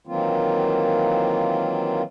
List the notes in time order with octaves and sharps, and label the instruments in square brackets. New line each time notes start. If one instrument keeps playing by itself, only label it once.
[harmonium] D#3 E3 F#3 A#3 C4 F4